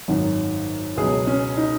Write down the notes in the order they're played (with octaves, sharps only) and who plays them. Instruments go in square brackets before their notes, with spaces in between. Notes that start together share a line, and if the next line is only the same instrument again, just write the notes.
[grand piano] G#1 F#2 D#3 F#3
C#2 B2 F#3 G#4
C#4
D#4